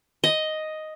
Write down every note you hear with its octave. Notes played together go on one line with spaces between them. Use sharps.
D#5